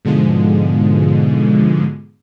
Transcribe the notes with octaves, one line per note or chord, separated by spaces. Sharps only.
G#2 B2 D3 F3 G#3